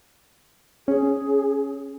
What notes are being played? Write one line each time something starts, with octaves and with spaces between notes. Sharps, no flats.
C#4 G#4